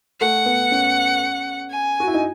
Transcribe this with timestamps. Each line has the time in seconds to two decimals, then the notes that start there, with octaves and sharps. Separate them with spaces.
0.21 A3 F#5
0.46 B3
0.71 C#4
1.71 G#5
2.00 F#4
2.07 E4
2.14 D#4